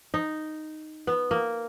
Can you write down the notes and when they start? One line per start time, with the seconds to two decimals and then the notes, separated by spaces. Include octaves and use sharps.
0.14 D#4
1.07 B3
1.31 A#3